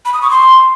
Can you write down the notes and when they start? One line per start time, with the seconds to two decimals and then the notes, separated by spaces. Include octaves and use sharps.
0.05 B5
0.14 D#6
0.22 C#6
0.30 C6